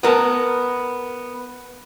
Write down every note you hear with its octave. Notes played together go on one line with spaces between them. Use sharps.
B3 A#4 A5